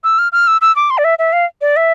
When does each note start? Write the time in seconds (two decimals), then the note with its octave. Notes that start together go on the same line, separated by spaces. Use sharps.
0.04 E6
0.19 F6
0.32 F6
0.47 E6
0.61 E6
0.76 D6
0.90 C6
0.98 D5
1.04 E5
1.19 E5
1.33 F5
1.61 D5
1.76 E5